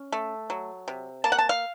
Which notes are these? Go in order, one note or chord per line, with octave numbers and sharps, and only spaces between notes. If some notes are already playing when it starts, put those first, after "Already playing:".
Already playing: C#4
A3
F#3
C3
A#3 A5
F#5
A5
F5